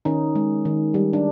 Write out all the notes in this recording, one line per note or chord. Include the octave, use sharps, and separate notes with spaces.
D#3 C#4 D#4
G#3
D#3
G3
D4